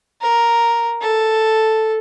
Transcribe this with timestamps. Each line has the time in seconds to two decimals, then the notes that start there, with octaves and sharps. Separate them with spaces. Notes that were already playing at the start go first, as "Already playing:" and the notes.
0.21 A#4
1.02 A4